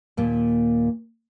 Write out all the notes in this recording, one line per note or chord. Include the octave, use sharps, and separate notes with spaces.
D#2 A#2 A#3